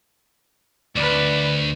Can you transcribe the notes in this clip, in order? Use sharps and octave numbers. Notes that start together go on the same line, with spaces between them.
D2 B4 D5